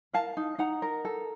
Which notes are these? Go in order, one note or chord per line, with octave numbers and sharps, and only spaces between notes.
A#4 F5 A5
D#4
D#4 F#5 A#5
A#4
A4